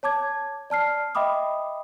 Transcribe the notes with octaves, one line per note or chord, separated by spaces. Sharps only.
C#5 A5 D6 G#6
D5 A5 F6 C7
D#5 E5 G5 B5 D6 D#6